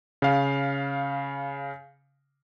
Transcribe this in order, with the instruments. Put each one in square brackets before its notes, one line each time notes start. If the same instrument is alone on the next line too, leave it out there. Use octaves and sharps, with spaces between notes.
[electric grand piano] C#3 F5